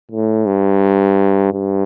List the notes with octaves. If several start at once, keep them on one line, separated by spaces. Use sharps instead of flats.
A2
G2
G2